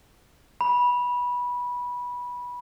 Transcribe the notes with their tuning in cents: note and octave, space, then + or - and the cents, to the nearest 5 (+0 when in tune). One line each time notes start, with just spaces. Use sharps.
B5 -15